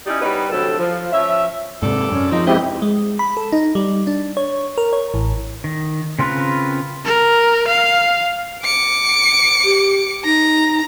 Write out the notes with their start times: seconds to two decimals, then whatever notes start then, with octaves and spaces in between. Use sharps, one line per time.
0.06 C#4 D#4 E4 G4 D5
0.22 G3 B3 D#4 B4 C#5
0.51 D2 C3 F#3 A4
0.78 F3
1.13 F3 C#4 E5
1.83 G#2 C3 A4 D5
2.12 F#2 C#4
2.32 C#3 F3 A#3 C4 D#4
2.47 G#3 C4 E4 G4 B4 D#5
2.82 G#3
3.19 B5
3.37 A4
3.52 D#4
3.75 G3
4.07 D4
4.37 C#5
4.78 A#4
4.93 C#5
5.14 A1
5.64 D#3
6.19 C#3 C4 F4 A#4 B4
7.05 A#4
7.67 F5
8.63 D6 C#7
9.65 G4
10.25 D#4 A#5